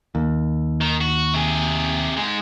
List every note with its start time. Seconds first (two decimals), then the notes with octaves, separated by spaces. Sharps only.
0.15 D#2
0.81 D#3
1.01 F#4
1.34 C3 G#4
2.17 G#2 G#3